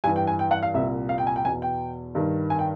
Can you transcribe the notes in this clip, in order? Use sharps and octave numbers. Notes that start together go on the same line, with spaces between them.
G2 E3 G#5
G5
G#5
G5
F#5
F5
C2 A#2 E5
F5
G5
G#5
G5
E2 B2 G#5
G5
G2 D#3
G#5
G5